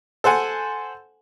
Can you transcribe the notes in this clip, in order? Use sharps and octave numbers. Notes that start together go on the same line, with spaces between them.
A4 C5 F#5 G#5